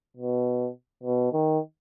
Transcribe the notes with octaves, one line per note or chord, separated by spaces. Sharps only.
B2
B2
D#3